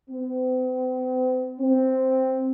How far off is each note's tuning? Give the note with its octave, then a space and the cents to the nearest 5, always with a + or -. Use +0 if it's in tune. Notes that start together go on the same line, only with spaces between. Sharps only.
C4 -45
C4 +0